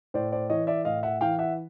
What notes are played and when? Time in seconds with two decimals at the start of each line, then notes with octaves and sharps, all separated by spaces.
0.14 A2 C5 D5
0.32 C5 D5
0.50 E3 C#5 D#5
0.67 D5 E5
0.85 A2 D#5 F5
1.03 E5 F#5
1.21 E3 F5 G5
1.39 E5 F#5